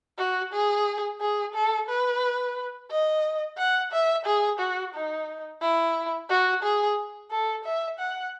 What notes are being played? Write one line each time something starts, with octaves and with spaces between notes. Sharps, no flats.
F#4
G#4
G#4
A4
B4
D#5
F#5
E5
G#4
F#4
D#4
E4
F#4
G#4
A4
E5
F#5